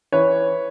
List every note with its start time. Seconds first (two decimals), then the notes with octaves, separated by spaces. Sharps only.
0.12 E3 B4 C#5